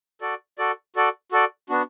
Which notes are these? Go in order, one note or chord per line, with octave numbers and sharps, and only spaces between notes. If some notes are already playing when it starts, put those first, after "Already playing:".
F#4 A4 D5
F#4 A4 D5
F#4 A4 D5
F#4 A4 D5
B3 D4 F#4